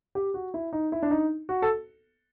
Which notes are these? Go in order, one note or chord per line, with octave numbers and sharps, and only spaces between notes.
G4
F#4
E4
D#4
E4
D4
D#4
F#4
A4